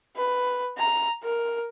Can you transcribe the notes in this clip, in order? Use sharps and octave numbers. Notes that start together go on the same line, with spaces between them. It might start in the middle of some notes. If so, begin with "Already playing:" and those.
B4
A#5
A#4